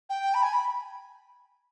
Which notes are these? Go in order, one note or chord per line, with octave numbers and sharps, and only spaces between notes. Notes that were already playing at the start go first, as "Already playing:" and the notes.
G5
B5
G#5
B5